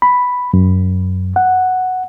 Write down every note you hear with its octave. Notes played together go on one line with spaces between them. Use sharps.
B5
F#2
F#5